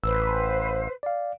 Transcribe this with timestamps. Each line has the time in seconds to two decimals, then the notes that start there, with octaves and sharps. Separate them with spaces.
0.04 A1 B4 C5 E6
1.03 D5 F5